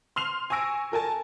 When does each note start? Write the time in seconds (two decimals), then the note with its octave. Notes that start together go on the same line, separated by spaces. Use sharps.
0.16 C6 F6 C7 F7
0.50 G#5 C#6 E6 A#6 D7
0.92 A4 A#4 G#5 A5